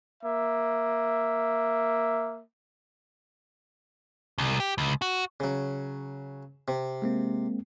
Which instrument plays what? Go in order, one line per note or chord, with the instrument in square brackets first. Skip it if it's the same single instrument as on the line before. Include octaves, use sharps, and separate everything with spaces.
[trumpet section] A#3 E5
[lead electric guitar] C2
G4
C#2
F#4
[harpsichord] C#3 F#3
C3
[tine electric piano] G#3 A#3 C4